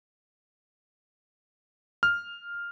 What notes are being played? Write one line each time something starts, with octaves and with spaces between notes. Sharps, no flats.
F6